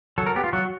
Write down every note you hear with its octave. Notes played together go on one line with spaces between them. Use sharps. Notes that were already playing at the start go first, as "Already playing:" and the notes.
F#3 A4
A#4
B3 G4
F4
F#3 F#4